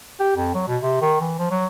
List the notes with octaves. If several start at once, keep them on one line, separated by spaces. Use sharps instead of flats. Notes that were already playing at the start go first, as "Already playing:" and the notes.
G4
F2
F#3
B2
C3
D#3
E3
F3
F#3